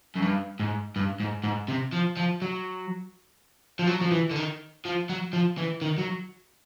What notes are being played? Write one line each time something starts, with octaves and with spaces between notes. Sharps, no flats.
F#2
G2
G#2
G2
G#2
G#2
C3
F3
F3
F#3
F3
F#3
F3
E3
D3
D#3
F3
F#3
F3
E3
D#3
F#3